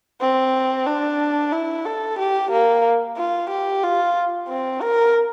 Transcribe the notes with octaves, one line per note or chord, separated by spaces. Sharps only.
C4
D4
E4
A4
G4
A#3
F4
G4
F4
C4
A#4